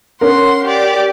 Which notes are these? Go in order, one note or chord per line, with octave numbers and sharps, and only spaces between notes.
C#4 A#4 F#5 C6
G4 D5